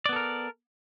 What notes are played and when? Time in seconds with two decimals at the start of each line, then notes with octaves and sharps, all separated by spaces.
0.06 D5
0.09 B3
0.13 A4
0.16 A#4